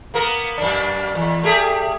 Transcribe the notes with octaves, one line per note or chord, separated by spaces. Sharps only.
A#3 B3 A#4
F#2 D4
E2
A3 G4 G#4